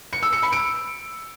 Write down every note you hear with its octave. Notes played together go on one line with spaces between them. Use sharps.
C#7
E6
C#7
B5
D7